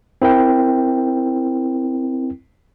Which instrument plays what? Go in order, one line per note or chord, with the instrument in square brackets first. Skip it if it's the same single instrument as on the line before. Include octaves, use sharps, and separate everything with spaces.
[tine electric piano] C4 E4 A#4 G5